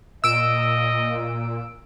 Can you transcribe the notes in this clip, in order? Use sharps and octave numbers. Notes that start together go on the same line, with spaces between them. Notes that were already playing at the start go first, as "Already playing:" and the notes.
A#2 D#5 E6 D7